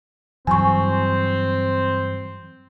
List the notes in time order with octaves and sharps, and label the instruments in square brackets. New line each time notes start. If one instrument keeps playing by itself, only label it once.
[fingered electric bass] G2 E3 F#3 [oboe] C4 [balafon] G#5 C#6